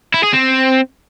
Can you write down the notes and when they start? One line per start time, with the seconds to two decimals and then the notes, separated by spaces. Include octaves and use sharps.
0.14 E4
0.23 G#4
0.33 C4